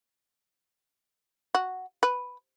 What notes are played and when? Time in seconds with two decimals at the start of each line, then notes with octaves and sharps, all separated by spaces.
1.55 F#4
2.03 B4